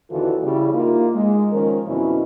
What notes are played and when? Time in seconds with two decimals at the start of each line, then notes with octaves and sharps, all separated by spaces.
0.11 D#2 D3 E3 F4 F#4 A4
0.43 C#3 G3 E4
0.74 A#3 D#4 F4
1.15 G#3
1.53 D#3 F3 C#4 A#4
1.87 F2 B2 D3 F#3 C#4 E4